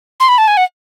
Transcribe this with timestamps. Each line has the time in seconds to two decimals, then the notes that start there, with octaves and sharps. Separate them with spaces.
0.20 C6
0.28 B5
0.38 A5
0.48 G#5
0.57 F#5